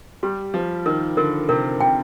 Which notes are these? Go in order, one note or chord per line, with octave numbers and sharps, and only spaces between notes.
G3 G4
F3 G4
D#3 A#4
D3 A#4
C3 A#4
C3 G5